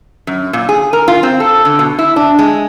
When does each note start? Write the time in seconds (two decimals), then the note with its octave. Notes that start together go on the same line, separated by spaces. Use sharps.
0.27 F#2
0.53 A#2
0.69 G#4
0.93 A#4
1.08 F4
1.23 C4
1.40 A4
1.65 D3
1.79 B2
1.99 E4
2.16 D4
2.39 G#3